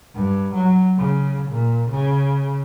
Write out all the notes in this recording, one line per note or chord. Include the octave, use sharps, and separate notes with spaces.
G2
F#3
C#3
A#2
C#3